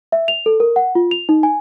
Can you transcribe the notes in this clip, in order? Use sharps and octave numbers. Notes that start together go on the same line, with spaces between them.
E5
F7
A4
A#4
F#5
F4
F7
D#4
G#5